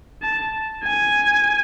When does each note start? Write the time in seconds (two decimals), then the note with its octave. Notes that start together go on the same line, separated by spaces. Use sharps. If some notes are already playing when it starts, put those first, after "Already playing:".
0.22 A5
0.84 G#5